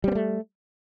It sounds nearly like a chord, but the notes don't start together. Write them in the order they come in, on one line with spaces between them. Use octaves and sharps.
G3 C4 B3 A3